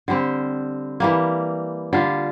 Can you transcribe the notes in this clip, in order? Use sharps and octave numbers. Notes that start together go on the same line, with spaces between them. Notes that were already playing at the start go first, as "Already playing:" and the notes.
D3 G3 C4
E3 G3 A#3
D3 G3 D4 F4